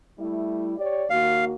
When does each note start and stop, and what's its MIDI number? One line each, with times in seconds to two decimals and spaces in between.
0.18 0.75 55
0.18 0.75 57
0.18 0.75 64
0.78 1.05 67
0.78 1.05 73
0.78 1.05 74
1.10 1.54 39
1.10 1.54 58
1.10 1.54 66
1.10 1.45 77